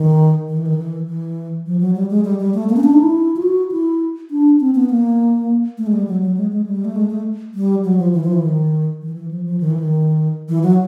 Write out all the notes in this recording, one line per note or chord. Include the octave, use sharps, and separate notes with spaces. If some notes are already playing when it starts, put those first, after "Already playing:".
Already playing: D#3
D#3
E3
D#3
E3
E3
F3
F#3
G3
G#3
G3
G3
A3
A#3
C#4
D4
D#4
E4
F4
F#4
E4
D4
C4
B3
A#3
A3
G#3
G3
F#3
F#3
G#3
G#3
G3
A3
G#3
A3
G3
F#3
F3
E3
F3
E3
D#3
E3
E3
F3
F3
D#3
E3
D#3
E3
F#3